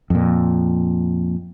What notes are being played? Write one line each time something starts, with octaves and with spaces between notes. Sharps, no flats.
F2 A#2